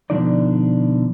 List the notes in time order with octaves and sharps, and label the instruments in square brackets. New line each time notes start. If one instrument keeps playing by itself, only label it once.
[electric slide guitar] B2 D3 F3 D4 D#4 D5